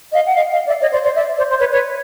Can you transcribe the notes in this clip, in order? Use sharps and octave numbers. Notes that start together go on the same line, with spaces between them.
D#5 F5
F#5
D#5 F5
D#5 F5
D5 E5
C#5 D#5
C5 D5
C5 D5
D5 E5
C5 D5
C5
B4 C#5
B4 C#5